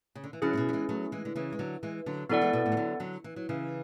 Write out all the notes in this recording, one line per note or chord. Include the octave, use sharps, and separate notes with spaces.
C#3
D3
E3
D3 F#3 C#4 E4 G#4
A2
B2
F#3
E3 G#3
F#3 A3
E3 G#3
D3
C#3 E3
G#3
D3 F#3
E3 G#3
D3 F#3
D3 F#3 B3 E4 A4 D5 F#5
E3 G#3
B2
A2
E3
D3 F#3
D3 F#3
E3
F#3
C#3 E3